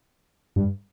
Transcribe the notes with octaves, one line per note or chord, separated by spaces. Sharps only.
G2